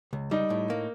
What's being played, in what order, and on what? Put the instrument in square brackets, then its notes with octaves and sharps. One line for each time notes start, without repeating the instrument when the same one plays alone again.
[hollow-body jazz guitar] C#2
[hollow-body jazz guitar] G3 [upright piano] D#4
[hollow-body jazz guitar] A2
A#3